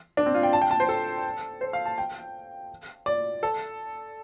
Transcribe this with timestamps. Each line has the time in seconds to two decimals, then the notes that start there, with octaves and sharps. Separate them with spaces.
0.17 D4
0.26 C4
0.35 F4
0.43 G5
0.53 A5
0.62 G5
0.71 A5
0.80 C5
0.89 A4
1.61 C5
1.73 F5
1.86 A5
1.98 G5
3.06 D5
3.43 A4